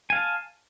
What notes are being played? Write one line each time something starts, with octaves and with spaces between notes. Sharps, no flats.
F5 G#5 A5